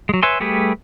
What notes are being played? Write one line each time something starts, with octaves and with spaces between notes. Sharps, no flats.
F#3 G#3
B4 C#5 E5 G#5 C6
G3 A3 G4 G#4 B4